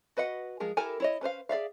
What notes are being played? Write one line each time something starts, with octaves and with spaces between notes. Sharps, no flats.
F#4 B4 D#5 F#5
F3 G#3 G#4 A#4
E4 G4 A4 A#4 G#5
E4 C#5 D#5
C#4 B4 C5 F5
G#4 D5 E5 F5